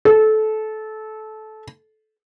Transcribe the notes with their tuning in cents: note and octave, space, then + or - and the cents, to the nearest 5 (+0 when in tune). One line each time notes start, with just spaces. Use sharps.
A4 -20